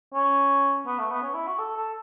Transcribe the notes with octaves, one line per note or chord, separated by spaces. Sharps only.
C#4
B3
A3
B3
C#4
E4
F#4
A4
A4